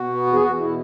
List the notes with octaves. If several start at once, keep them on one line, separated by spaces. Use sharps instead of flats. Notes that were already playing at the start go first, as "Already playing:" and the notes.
Already playing: B2 F#4
B3
E2
G#4
E2 F#4
F#4
B2 E4